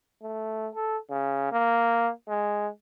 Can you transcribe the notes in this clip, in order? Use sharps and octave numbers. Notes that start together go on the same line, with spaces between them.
A3
A4
C#3
A#3
G#3